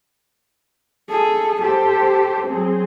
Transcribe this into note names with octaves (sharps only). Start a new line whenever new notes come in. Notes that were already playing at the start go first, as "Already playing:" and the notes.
G#4 A4
G4 A4 C5
F#3 C4 G#4